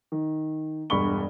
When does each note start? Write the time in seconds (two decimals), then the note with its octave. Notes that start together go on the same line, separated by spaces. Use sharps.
0.12 D#3
0.90 E1 G2 B5 C#6 G7